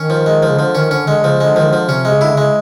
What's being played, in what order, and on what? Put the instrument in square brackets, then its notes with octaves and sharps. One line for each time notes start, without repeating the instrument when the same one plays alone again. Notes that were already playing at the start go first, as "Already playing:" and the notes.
Already playing: [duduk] D#3 [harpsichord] C#4
[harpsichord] F3
G#3
F3
[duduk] C#3
[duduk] D3 [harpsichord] F3
[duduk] D#3 [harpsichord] C#4
[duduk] D3 [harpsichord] C#4
[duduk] D3 [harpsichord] G#3
[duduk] D3
[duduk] C#3 [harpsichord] F3
[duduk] C#3
[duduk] D3 [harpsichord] G#3
[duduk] D#3 [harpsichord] F3
[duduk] D3
[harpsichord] F3
[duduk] C3 [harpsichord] C#4
[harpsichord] G#3
[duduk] C#3
[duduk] D3 [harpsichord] E4
[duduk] C#3 [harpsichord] G#3